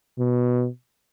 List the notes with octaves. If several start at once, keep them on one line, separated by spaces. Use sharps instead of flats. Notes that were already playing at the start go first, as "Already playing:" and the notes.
B2